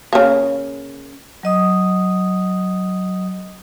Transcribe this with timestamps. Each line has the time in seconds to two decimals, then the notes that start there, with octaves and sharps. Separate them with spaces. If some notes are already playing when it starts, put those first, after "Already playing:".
0.13 C#3 A#3
1.43 F#3 D#5 D#6